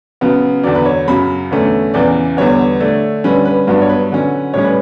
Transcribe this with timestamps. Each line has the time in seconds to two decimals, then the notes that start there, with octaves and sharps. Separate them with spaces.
0.21 C#3 F#3 B3
0.63 E2 D3 F#3 D5
0.75 B4
0.86 C#5
1.08 F#2 C#3 F#3 B5
1.51 E2 D3 A3 C#4
1.94 E2 C#3 E3 D5
2.37 E2 D3 G3 B3 C#5
2.80 D3 A3 D4
3.24 D3 G3 C#4 B4
3.45 B4
3.67 G2 F#3 B3 D4
3.82 C#5
3.89 B4
4.11 D3 F#3 C#4
4.54 A2 G3 C#4 C#5
4.64 B4